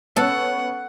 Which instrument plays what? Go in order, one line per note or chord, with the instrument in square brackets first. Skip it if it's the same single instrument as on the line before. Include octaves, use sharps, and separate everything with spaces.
[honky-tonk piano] B3 C#4 [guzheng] A4 [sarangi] F#5